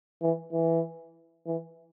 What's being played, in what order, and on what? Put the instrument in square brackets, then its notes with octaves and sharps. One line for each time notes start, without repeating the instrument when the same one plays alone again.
[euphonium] E3
E3
E3